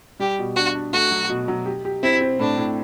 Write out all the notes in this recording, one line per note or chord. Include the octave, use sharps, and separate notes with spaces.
G3 G4
B2
D4 F#4
D4
A3 F#4
F#3
B2
F#3
G4
G4
C4 E4
C4
A2 D4
A2